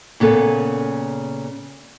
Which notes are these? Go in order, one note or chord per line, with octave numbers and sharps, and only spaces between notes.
A#2 C#3 B3 A4